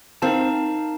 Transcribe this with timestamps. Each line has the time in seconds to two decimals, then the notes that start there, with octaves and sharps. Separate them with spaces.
0.22 C4 D#4 A#4 F5 A5